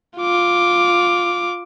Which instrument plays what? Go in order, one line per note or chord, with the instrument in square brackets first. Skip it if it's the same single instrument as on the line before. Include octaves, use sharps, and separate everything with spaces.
[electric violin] F4 D6